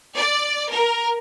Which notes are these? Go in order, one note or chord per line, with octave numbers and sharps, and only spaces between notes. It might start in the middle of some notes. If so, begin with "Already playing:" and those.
D5
A#4